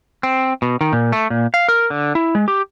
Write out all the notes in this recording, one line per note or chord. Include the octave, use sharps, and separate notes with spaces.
C4
B2
D#3
A#2
A3
A#2
F5
A#4
D3
E4
G#3
G4